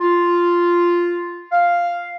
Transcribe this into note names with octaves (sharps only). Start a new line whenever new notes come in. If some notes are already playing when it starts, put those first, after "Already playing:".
F4
F5